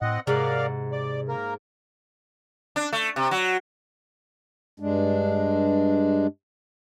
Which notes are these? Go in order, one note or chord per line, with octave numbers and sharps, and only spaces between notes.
A2 C4 D#5 F#5
G#2 C3 A#4 D5 F5 F#5
D5
A#3 A#4
D4
A3
C3
F#3
G2 G#3 D4